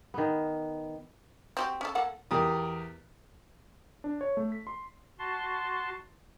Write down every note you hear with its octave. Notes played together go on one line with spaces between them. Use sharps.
D#3 B3
C4 F#4 G4
C#4 A4
A#3 A4 F#5
E2 G4 A#4 D#6
D4
C#5
A3
B6
C6
F#4 A5 C6